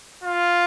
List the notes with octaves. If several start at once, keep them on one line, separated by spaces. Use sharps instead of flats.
F4